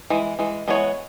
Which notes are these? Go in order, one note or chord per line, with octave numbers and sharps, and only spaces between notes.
E3 G#3
E3 G#3
E3 G#3 B3 F#4 C#5